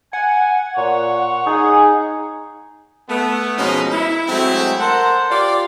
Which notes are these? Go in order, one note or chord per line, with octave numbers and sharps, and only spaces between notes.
F#5 G#5
A#2 C#5
D#4 G#4
A3 B3
B2 F3 G#3 C#4 D#4
E4
F#3 G#3 A3 C4 E4
A4 A#4 C5 F#5
F4 G4 D5